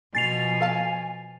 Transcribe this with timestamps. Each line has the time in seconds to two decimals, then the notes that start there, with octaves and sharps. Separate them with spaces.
0.15 B2 F3 G#5 A6 C7 F7
0.61 A4 F5 A5